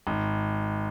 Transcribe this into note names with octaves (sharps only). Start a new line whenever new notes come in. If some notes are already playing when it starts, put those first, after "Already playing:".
G#1